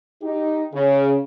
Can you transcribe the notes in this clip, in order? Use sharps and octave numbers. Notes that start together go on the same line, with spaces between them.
D#4 G4
C#3